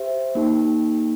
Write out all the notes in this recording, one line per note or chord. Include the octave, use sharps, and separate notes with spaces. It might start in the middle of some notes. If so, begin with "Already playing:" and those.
Already playing: G4 C5 E5
A#3 D#4 G4